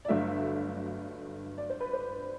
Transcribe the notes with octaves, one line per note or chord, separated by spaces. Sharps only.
D5
G1 G2 D3 F#3 A3 E5
D5
C5
B4
C5